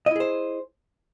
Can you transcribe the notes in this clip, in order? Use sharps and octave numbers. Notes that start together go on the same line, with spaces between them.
E4 G#4 C5 D#5